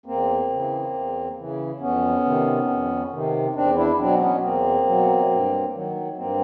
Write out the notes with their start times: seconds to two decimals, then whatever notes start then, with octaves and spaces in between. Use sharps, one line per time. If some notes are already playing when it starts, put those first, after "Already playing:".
0.06 E2 A#3 C4
0.50 C#3 E3
0.93 E2
1.37 C#3 E3
1.80 F2 B3 C#4
2.25 C3 D#3
2.68 F2
3.11 C3 D#3
3.55 E2 C4 D4
3.77 D4 E4
3.99 B2 F#3 C4 D4
4.21 B3 C#4
4.42 E2 A#3 C4
4.86 B2 F#3
5.30 G2
5.74 D#3 F#3
6.17 G2 A#3 C4